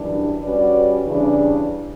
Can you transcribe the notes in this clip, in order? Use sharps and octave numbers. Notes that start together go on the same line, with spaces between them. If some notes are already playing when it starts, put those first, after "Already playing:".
Already playing: F#2 E3 G3 D4
G3 C#4 F#4 B4 D5
C#3 E3 G3 D4